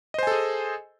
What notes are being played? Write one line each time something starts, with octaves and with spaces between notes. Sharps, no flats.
G#4 A4 C5 D#5 G#5